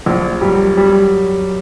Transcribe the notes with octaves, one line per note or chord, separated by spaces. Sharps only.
A#1
F#2 F#3 G3
G3